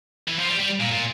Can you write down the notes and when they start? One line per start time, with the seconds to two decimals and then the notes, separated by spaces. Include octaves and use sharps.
0.28 E3
0.40 F3
0.49 G3
0.60 G3
0.80 A#2
0.91 A#2